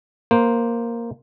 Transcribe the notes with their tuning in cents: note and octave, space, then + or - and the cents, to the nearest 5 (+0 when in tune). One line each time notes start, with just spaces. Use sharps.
A#3 +0 C5 +0